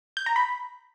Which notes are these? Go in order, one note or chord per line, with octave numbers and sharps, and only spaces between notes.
G6
A#5
B5